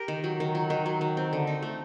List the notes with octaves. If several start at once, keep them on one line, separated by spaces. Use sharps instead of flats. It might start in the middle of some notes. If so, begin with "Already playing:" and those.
Already playing: G4 A#4
D#3
F#3
D#3
F#3
D#3
F#3
D#3
C4
D3
D#4
A3